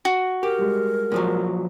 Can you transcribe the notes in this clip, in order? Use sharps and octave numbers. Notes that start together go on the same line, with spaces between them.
F#4
G4 A#4
G3 G#3
A#2 F3 F#3